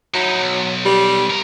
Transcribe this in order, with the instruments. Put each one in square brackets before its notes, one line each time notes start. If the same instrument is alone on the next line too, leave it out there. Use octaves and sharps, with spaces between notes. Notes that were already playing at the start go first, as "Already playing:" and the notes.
[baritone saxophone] F#3 [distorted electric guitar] D#4 E4
[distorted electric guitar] B1
[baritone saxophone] G3
[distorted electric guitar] C2 A#4